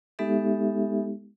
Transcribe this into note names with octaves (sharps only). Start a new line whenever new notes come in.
G#3 B3 D#4 G4 A4 E5